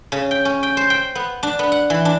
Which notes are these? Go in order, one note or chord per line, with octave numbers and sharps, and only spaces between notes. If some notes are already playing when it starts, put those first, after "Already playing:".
C#3
G5
C#4
G5
C5
G5
B3
D4
B3
F#5
E3
D4